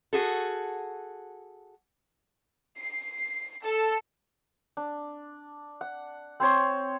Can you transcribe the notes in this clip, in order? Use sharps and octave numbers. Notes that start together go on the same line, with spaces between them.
F#4 G#4 A4
C7
A4
D4
F#5
C4 C5 C#5 C6